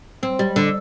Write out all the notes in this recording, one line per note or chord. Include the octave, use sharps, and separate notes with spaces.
C4
G3
D3